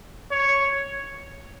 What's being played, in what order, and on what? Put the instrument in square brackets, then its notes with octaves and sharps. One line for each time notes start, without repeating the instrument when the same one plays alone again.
[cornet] C#5